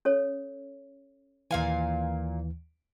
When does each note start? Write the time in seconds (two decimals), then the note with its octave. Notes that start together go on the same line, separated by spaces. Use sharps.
0.05 C#4 A4 C#5
1.51 D#2 A#2 E3 F5 G#5